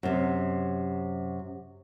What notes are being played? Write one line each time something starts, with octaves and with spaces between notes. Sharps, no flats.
F#2 C3